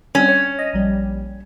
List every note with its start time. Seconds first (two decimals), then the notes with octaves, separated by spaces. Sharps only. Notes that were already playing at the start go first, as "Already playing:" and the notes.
0.15 G3 C4 C#4
0.28 C#5
0.59 D#5
0.73 A#1 G3